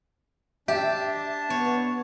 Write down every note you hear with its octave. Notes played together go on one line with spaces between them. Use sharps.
D4 G4 E5 A5
B3 C#5